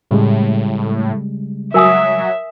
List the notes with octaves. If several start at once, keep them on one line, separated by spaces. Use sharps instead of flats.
A2 C#3 G3 G#3
F#3 A#4 E5 G#5 D#6